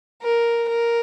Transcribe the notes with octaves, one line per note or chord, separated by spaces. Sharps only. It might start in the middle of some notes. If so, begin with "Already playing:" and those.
A#4
A#4